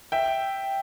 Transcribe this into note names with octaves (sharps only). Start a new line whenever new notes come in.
E5 G5